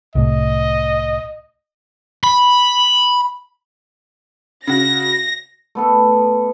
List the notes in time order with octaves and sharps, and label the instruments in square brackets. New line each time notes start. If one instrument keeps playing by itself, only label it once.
[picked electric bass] C2 A2 [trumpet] D#5
[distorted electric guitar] B5
[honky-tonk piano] C#3 F#4 [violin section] A#6
[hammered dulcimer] A3 B3 A4